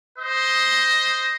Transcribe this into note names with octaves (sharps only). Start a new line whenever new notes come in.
C5 D#5